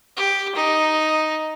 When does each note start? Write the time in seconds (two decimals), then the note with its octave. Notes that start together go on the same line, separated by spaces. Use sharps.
0.17 G4
0.55 D#4